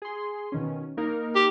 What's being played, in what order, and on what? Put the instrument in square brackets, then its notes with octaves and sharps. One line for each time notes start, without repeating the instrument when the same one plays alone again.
[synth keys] G#4 C6
B2 D#3 C#4
A#3 D#4 A#4
[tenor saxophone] G4